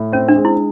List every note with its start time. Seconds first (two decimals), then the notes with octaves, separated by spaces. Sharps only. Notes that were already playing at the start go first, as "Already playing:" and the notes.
Already playing: A2
0.12 C4 C#4
0.29 D4
0.36 G#3
0.45 E4